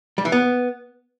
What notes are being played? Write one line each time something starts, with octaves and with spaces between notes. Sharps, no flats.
G3
E3
B3